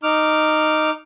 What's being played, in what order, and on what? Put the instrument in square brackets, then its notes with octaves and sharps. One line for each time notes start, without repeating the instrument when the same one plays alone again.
[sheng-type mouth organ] D#4 D6 F6